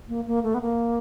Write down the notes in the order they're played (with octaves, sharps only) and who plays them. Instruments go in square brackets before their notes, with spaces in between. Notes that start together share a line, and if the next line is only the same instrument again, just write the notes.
[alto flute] A#3
A#3
A3
B3
A#3